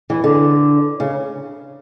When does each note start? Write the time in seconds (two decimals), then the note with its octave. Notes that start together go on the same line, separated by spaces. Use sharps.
0.10 E3
0.24 D3
1.00 C#3